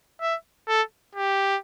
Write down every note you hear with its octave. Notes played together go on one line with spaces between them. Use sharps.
E5
A4
G4